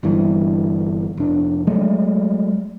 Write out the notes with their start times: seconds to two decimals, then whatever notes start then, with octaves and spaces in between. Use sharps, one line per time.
0.03 G1 G2 E3
1.17 F1 D4
1.67 F#3 G#3 A3